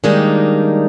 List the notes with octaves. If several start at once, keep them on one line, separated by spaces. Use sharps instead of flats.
D#3 G3 G#3 A#3 D4 D#4